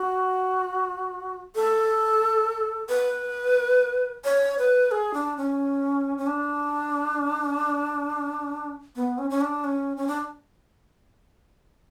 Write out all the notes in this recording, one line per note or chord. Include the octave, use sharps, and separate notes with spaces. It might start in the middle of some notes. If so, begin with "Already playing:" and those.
Already playing: F#4
A4
B4
C#5
B4
G#4
D4
C#4
C#4
D4
B3
C#4
C#4
D4
C#4
C#4
D4